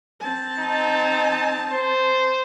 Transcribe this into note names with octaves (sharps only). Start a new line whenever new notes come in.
C4 A5
D#4
C5